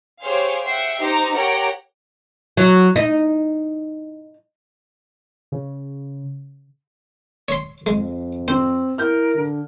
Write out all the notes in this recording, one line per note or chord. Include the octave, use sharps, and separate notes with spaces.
G4 G#4 C5 C#5 F5
E5 F#5 G5 C7
D#4 G4 C5 A#5
G4 A#4 C#5 F#5 A#5 D7
F#3
D#4
C#3
C#5 C6
F2 G#3
C4 C5
E4 A#4 F6 G6
D3